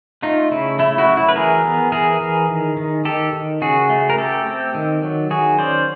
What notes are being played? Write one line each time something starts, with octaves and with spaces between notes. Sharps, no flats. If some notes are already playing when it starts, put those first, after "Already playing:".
A3 D#4 F4
C#3 E4
A3 E4
E4 F#4
F#3
E4
B4
E3 G#4 A#4
B3
E3 G#4 A#4
E3
D#3
D#3
D#3 G4 A4
D#3
C#3 F#4 G#4
A3
A#4
A3 G4 A4
C4
D#3
F#3
D#3 F#4 G#4
C#4 C5 D5